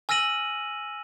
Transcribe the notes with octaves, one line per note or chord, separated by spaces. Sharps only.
G#5 E6 F6 A#6 D#7 F#7